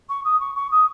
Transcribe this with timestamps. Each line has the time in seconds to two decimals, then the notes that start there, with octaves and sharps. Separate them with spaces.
0.09 C#6
0.24 D#6
0.40 C#6
0.56 C#6
0.71 D#6